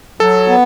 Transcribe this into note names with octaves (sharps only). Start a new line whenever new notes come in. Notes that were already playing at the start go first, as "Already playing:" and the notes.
F#3 A4
B3